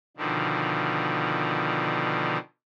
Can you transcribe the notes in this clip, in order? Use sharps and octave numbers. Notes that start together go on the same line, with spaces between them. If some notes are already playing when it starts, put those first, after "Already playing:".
B2 D3 D#3 F3